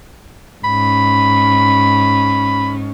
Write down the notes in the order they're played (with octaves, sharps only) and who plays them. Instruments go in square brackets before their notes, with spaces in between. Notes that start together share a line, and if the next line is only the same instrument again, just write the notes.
[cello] G#2 C#4 [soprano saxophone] B5